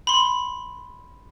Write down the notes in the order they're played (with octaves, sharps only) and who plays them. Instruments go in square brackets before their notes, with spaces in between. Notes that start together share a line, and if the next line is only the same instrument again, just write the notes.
[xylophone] B5 C6